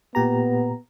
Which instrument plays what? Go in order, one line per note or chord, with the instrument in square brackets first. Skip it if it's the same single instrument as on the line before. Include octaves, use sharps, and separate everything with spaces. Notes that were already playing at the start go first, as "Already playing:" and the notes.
[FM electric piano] A#2 G4 A#5 [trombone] B3